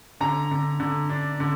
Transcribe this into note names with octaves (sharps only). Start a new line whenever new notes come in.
D3 A#5
D3
D3
D4
D3